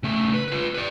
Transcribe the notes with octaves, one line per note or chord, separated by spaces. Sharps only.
C#3 A3
B4
F4 B4
B4 D5